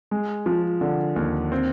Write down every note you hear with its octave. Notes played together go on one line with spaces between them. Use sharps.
G#3
F3
D3
D#2
C4